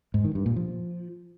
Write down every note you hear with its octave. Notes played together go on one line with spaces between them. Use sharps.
G#2
D#3
G2
A#2
F3